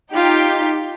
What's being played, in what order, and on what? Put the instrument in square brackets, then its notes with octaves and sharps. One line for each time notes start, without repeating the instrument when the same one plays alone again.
[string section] D#4 G4 [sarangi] F4